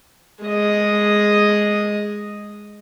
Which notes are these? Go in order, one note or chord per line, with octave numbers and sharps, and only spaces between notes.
G#3 D#5